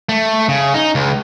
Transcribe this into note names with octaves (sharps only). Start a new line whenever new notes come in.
A3
C#3
D#4
C#2